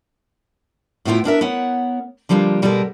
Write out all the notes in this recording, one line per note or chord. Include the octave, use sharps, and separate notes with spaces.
A2 A3 B3 E4 F4 G5
B3 D4 A#4 E5
B3 A#4 C#5 F#5
D3 F3 G3 A#3 D4
B2 G3 G#3 B3 A4 A#4